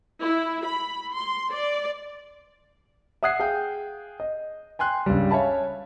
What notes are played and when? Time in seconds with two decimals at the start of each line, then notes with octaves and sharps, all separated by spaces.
0.23 E4
0.65 B5
1.14 C6
1.53 D5
3.23 E5 F#5 D#6 F#6 G#6 C7
3.40 G#4 F5 G5 G6
4.20 D#5
4.79 G5 G#5 C6 F#6
5.06 C#2 G2 G3
5.31 C#5 E5 F5 G#5 A5 B5